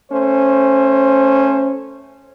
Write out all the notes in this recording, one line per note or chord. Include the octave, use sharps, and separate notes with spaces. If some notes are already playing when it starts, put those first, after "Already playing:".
A3 C#4 C5